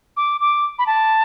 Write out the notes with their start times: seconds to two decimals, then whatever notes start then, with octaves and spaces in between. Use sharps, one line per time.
0.17 D6
0.41 D6
0.79 B5
0.87 A5